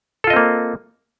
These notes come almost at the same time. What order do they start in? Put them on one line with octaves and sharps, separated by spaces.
A4 F4 D#5 C4 A#3